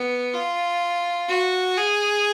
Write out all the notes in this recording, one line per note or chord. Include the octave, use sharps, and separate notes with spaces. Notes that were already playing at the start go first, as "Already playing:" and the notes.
Already playing: B3
F4
F#4
G#4